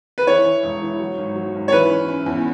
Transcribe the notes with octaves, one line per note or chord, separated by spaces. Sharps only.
B4
E3 C#5
E3
E1
E3
F#3
G#1
F#3
G#1
C#5
E3 B4
C#4
C#4
E2